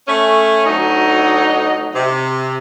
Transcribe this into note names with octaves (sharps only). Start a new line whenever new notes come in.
A3 C#4
D2 F#3 D#4
C3